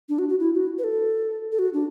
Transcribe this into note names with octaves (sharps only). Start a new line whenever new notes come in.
D4
F#4
F#4
E4
F#4
B4
A4
A4
F#4
D4